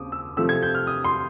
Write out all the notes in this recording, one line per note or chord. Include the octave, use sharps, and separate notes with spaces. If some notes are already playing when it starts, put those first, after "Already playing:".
Already playing: D#2 C#3 C4 D6 D#6
E6
C3 F3 A3 C4 E6
G#6
G6
F6
D#6
C6